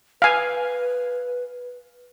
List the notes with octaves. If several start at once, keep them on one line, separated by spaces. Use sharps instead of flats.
B4 F5 G#5